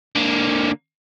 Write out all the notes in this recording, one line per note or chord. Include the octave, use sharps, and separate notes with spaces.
D3 A#3